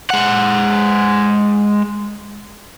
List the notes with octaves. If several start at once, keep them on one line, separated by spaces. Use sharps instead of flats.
G#3 F#5